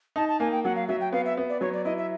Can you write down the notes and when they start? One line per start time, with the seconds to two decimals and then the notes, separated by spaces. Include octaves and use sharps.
0.16 D#4 A5
0.28 A5
0.40 A#3 G#5
0.52 G5
0.64 F#3 F#5
0.76 F5
0.88 F#3 E5
1.01 G5
1.13 B3 F5
1.25 E5
1.37 B3
1.49 D5
1.61 F#3 C#5
1.73 D5
1.85 E4 D#5
1.98 E5